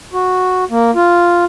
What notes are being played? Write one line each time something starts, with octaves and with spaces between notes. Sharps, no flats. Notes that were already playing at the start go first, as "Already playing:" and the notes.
F#4
A#3
F4